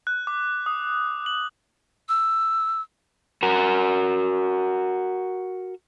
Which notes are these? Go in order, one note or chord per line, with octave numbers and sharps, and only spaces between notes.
F#6
D6
D#6
F#7
E6
F#4 A#4